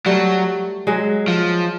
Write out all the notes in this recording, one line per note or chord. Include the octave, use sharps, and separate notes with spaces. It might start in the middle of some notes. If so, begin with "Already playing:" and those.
F#3 G3 A3
F#3 G#3
F3